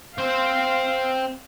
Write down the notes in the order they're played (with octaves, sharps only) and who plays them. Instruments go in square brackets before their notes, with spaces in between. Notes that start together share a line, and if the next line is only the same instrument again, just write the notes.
[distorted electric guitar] C4 C5 [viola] F5